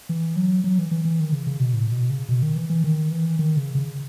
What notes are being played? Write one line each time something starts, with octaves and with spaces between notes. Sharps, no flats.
E3
F#3
F#3
E3
E3
E3
D#3
C#3
C#3
B2
A2
B2
C#3
B2
D#3
E3
E3
D#3
E3
D#3
C#3
C#3